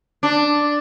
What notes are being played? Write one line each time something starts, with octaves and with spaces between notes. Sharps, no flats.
D4